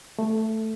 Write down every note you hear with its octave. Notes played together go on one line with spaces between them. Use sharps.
A3